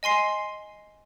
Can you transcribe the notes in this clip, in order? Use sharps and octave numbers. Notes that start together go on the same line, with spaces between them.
D#5 G#5 C6 C7